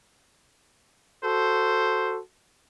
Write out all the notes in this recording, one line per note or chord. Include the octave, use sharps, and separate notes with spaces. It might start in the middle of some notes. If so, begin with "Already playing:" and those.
F#4 A4 C5